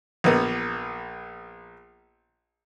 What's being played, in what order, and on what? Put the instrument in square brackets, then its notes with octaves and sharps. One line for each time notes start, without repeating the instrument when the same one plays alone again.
[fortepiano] A#1 A#3 B3